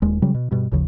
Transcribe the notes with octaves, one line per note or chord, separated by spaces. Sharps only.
D#1 D#2 G#3
C#3 F#3 G3
B2
G2 B2
G#1 D#2 C#3 F3